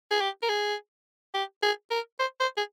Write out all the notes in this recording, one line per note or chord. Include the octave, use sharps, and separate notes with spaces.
G#4
G4
A#4
G#4
G4
G#4
A#4
C5
C5
G#4